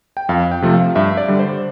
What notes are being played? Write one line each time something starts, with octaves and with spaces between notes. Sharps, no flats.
G5
F2 F5
G5
C3 F3 A3
F5
G2 E5
D5
D3 G3
C5